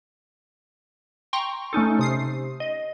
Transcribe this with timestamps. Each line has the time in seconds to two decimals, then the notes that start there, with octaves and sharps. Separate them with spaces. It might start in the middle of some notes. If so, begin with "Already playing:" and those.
1.33 G5 A#5 C6 C#6
1.73 A3 C#4 D#4 A4
1.99 C3 D#6 C7
2.60 D#5